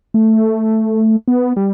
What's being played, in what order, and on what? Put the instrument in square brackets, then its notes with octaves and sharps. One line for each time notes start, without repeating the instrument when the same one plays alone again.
[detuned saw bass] A3
B3
G3